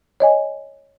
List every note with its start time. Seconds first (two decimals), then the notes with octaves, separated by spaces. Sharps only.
0.20 C#5 D#5 G#5